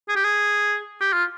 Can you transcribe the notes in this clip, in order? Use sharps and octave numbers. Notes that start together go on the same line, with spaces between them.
G#4
G4
G#4
G4
F4